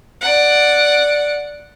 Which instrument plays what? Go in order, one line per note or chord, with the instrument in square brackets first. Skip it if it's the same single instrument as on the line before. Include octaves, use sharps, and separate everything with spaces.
[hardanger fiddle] D5 F#5